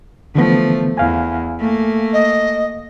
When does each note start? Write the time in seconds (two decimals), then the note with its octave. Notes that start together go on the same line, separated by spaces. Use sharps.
0.35 D3 E3 F3 A3 B3
0.97 E2 F5 G#5
1.60 A3 A#3
2.13 D#5